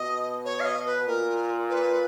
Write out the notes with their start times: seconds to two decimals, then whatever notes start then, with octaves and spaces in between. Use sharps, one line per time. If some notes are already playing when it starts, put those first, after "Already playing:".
Already playing: B2 D#5
0.45 C#5
0.60 F5
0.65 D#5
0.86 B4
1.07 A#2 A#4
1.69 B4